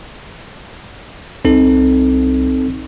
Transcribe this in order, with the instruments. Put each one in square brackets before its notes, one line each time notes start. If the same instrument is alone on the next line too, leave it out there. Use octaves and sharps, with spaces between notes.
[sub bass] C2 [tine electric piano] C4 D#4 A4